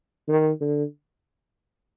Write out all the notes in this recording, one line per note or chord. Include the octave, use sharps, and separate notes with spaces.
D#3
D3